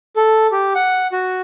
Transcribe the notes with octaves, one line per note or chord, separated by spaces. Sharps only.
A4
G4
F#5
F#4